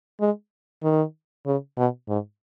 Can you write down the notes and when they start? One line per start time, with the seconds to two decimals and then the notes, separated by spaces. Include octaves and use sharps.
0.20 G#3
0.83 D#3
1.46 C#3
1.77 B2
2.08 G#2